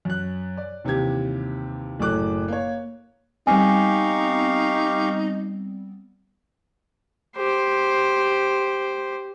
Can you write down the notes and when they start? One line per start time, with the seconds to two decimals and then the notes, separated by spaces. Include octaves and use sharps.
0.05 F#2 F#6
0.57 D5
0.84 D#2 C3 E3 G4 G#6
1.99 F#1 A2 F#3 A4 D6 F#6
2.48 A#3 C#5
3.47 G3 B3 C4 D#4 G4 F5 G#5 C#6
7.37 G4 C5